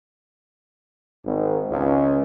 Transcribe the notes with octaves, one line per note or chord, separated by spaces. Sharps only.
G#1
C#2